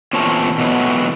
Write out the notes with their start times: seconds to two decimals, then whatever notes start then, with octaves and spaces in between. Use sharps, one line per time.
0.13 E2 A#2 C4 C#5 A5
0.58 B2 D3 E3 F#3 A3 B3